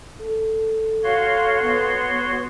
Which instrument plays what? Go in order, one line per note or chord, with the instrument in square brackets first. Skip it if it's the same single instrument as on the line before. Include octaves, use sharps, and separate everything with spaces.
[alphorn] A4
[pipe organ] F#4 C#5 C6 [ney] F5
[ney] B3